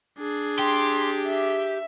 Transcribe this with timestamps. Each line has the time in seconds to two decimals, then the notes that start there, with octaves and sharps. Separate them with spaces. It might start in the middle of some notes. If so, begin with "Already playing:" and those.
0.18 D4 G#4
0.59 G4 C6
1.27 E5